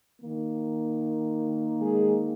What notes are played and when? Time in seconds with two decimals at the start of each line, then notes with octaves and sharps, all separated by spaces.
0.20 D#3 A#3
1.81 G#3 G#4